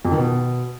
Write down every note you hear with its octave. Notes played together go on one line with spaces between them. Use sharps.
F2
D#3
B2